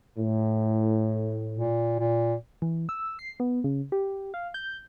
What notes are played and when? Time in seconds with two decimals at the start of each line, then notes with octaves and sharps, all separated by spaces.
0.18 A2
1.57 A#2
1.99 A#2
2.62 E3
2.89 E6
3.19 C7
3.40 B3
3.64 C#3
3.92 G4
4.34 F5
4.54 G6